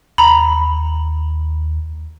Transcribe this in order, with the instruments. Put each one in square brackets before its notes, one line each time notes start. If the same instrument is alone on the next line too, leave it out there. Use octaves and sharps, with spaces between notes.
[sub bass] D#2 [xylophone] A#5 B5